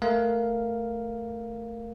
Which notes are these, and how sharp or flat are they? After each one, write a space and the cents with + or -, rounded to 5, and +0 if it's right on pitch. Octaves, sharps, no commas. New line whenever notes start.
A3 +0 A#4 +5 F5 +0